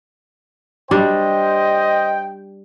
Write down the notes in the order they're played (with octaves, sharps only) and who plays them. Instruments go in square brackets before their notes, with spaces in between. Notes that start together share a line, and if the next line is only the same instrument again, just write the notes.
[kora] G3 D4 [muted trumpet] C5 [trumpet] D#5 [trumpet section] G5